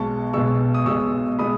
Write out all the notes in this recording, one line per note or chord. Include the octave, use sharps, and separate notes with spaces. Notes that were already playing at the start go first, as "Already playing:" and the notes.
Already playing: B1 B2 G#3 A5 C#6
B1 B2 G#3 C#6 E6
D#6
B1 B2 G#3 C#6 E6
B2 G#3 B5 D#6